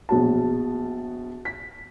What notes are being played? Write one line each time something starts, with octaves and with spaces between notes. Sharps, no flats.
A#1 B2 F#3 A5
B6